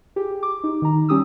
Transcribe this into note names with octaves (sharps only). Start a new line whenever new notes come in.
G4 G#4
D6
D#4
D#3 A#5
G3 C#4 G4 D#6 E6